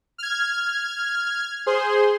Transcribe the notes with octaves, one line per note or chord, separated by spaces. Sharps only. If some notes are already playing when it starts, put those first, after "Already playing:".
F6 G#6
G#4 C5 C6